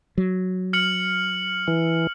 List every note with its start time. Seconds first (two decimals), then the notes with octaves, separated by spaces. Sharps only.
0.18 F#3
0.73 F6 C#7 F#7
1.68 E3